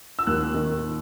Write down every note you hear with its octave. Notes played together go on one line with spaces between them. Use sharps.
E6
D#2 F#6
D#3